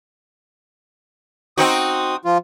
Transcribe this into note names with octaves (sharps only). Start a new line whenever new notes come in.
C4 D#4 F#4 D#6
F3 F4